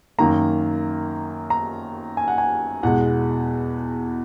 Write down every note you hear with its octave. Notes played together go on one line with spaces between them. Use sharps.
F#2 D#3 A#3 A#5
A#5
G#5
F#5
G#5
E2 B2 G#3 F#5